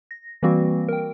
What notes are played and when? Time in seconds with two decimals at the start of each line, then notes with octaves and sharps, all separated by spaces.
0.11 A#6
0.43 E3 G3 A#3 C4 F#4
0.88 A#4 G5